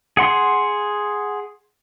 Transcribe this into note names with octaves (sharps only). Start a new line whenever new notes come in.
G#4 F#5 C6